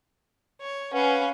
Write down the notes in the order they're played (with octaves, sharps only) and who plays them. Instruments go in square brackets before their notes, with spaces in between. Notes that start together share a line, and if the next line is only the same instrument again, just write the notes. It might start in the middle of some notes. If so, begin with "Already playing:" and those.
[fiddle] C#5
[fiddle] C#4 [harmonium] B4 F5 F#5